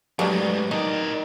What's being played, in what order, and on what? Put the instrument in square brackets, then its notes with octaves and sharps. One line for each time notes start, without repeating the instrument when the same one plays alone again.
[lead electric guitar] G#2 A3 [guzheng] F#3 [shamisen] G3 C#4 A#4 [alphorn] B4
[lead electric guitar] A2 D5 [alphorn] D#3 [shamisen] D#4